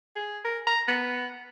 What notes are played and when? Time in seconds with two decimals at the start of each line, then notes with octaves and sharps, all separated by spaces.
0.16 G#4
0.45 A#4
0.67 A#5
0.88 B3